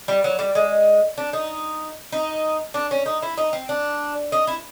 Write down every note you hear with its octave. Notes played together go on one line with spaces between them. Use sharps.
G3
F#3
G3
G#3
D4
D#4
D#4
D4
C#4
D#4
E4
D#4
C4
D4
D#4
E4